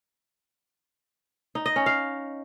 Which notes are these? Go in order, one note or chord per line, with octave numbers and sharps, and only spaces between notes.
D#4
D#5
C#4
F5